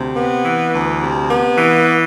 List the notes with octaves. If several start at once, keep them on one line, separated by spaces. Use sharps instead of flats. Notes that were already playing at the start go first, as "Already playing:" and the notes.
Already playing: D2 C3
B3
E3
D2
C3
B3
E3